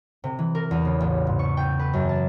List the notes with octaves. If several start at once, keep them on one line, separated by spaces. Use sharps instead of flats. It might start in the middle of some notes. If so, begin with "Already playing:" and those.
C3
E3
A#4
E2
C#3
A1
G#2
C#6
G5
B4
F#2
A5